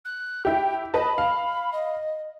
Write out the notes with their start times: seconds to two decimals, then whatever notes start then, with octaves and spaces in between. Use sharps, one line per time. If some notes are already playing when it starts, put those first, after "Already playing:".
0.05 F#6
0.45 E4 G4 G5
0.94 B4 D#5 A5 B5
1.18 F5
1.72 D#5